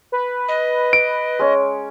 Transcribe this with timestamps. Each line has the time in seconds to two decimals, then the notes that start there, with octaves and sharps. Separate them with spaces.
0.12 B4
0.48 D#5
0.93 D7
1.39 G#3 C#4 C#5